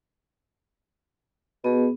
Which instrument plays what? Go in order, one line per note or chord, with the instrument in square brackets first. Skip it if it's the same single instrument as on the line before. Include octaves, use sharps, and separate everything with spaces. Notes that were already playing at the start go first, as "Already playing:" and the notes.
[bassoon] B2 [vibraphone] B3 G#4